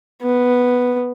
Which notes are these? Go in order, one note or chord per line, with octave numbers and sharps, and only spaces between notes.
B3